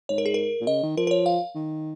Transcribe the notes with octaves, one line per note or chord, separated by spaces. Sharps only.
G#2 C#5
A#4
G#4
A#4
A#2
C#3 D#5
D#3
F3 A#4
A#4
C#5
F5
D#3